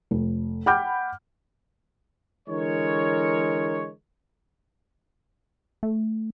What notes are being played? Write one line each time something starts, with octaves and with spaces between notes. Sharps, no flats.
F1
F#5 G5 B5 D6 F6 G6
D3 E3 G#3 A#4 C#5
A3